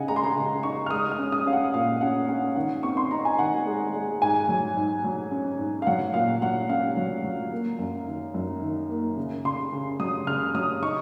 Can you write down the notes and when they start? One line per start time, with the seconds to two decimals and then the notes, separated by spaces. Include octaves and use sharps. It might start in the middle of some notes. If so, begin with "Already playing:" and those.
Already playing: C#3 D#4 F#5 G#5
0.08 G#3 A#5
0.16 C6
0.24 A#5
0.36 C#3
0.63 D#4 C#6
0.86 F6
0.91 G#3 D#6
1.11 F6
1.19 C#4
1.32 D#6
1.46 C#4 F5
1.53 F#5
1.74 A#2 F5
2.01 C#4 F#5
2.28 C#4 F#5
2.56 D#3 F#5
2.83 C4 C#6
2.97 C6
3.11 D#4 A#5
3.25 G#5
3.39 D#3 F#5
3.66 G#3
3.94 G#3
4.22 G#2 G#5
4.49 F#3
4.76 G#2
5.04 F#3
5.31 C#4
5.59 G#2
5.82 F5
5.87 F#3 F#5
6.14 A#2 F5
6.42 F#3 F#5
6.69 C#4 F5
6.97 F#3
7.24 F#3
7.52 A#3
7.79 F#2
8.07 D#3
8.34 F#2
8.62 D#3
8.89 A#3
9.17 C#3
9.45 C#3 C6
9.72 C#3
10.00 F#3 D#6
10.27 C#3 F6
10.54 F#3 D#6
10.82 D#4 C#6